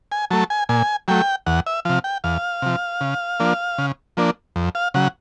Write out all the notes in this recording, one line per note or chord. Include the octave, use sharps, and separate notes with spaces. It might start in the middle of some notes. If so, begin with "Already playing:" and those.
G#5
F#3 A3 A5
G#5
A#2 G#5
F#3 A3 G5
E2 F#5
E5
C3 F3 F5
G5
E2 F5
C3 F3
C#3
F3 A#3 D4
C#3
F3 A#3 D4
F2
F5
C#3 F#3 F#5